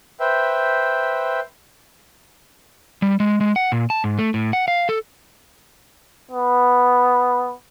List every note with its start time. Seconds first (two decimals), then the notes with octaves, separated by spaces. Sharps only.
0.20 B4 C5 E5 G5
3.02 G3
3.20 G#3
3.41 G#3
3.56 F#5
3.72 A#2
3.90 A5
4.04 G#2
4.19 A3
4.34 A2
4.53 F#5
4.68 F5
4.89 A4
6.31 B3